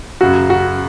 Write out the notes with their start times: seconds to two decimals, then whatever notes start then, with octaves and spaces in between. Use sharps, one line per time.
0.21 F#2 C#3 F#3 F#4
0.50 F#4